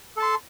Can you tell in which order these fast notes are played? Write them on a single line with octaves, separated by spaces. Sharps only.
A4 A5 C6